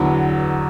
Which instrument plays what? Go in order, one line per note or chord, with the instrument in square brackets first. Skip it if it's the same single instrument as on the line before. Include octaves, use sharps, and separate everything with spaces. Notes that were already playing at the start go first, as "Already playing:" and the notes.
Already playing: [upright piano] E2 D3 F#3 B3